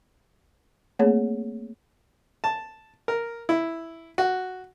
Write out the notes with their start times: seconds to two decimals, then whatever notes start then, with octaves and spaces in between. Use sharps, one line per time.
0.99 A3 A#3 C4 G#4 C#5
2.44 A5
3.08 A#4
3.49 E4
4.18 F#4